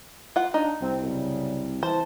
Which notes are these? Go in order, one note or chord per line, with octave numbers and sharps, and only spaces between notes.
F4 F#5
D4 D#4
C2 C4
F#2 C#3 G3
E3 C5 A5